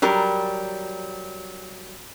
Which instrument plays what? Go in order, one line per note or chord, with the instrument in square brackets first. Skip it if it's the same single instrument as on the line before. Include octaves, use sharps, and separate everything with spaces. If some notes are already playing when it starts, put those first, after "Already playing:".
[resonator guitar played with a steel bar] F#3 G3 A#4